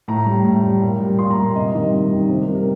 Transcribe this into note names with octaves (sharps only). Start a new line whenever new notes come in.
A2 A#5
G3
A2
G3
A#2
G3
A#2 C6
A#5
G3
C3 D#5
D#3 G3
C3
D#3 G3
C3 C5
A#4
G3
A#4